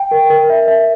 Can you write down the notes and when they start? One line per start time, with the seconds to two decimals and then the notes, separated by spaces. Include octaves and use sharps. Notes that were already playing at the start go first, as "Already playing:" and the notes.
Already playing: G5
0.11 A#4
0.30 A#4
0.50 E5
0.68 E5